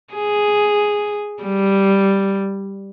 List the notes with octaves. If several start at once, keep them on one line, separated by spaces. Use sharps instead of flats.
G#4
G3